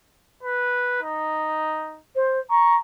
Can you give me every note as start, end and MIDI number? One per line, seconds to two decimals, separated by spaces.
0.43 0.98 71
1.02 2.00 63
2.15 2.39 72
2.50 2.77 82
2.50 2.76 85